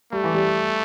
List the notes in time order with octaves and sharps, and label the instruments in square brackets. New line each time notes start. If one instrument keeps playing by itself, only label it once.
[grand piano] G3 [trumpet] A3
[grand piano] E3
G3